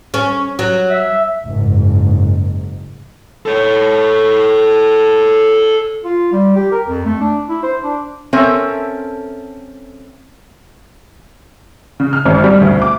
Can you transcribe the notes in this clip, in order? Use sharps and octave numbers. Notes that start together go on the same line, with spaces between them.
C#4
F#3
E5
F#1 G#2
A4 C#5
F4
G3
G4
A#4
F2
A3
D4
E4
C5
D4
C4 C#4 A4 A#4 E5
C#3
F6
G#1
G3
D2
D6